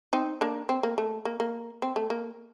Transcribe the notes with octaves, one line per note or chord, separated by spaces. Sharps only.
C4 D#4
A#3 D4
C4
A#3
A3
A#3
A#3
C4
A3
A#3